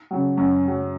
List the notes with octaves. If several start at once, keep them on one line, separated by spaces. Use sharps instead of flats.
C#3 F#3
F#2
C#3 F#3